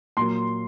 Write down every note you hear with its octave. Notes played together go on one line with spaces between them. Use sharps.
A#2 F#3 A#3 C6